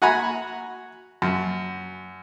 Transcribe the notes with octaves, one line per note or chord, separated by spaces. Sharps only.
F#4 F#5 G#5 A#5 B5
F#2